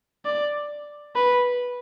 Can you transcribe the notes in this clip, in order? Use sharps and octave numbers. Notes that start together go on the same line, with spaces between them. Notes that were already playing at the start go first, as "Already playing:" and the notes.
D5
B4